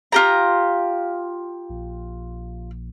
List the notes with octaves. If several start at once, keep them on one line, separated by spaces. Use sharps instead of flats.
F4 G4 A#5
A#1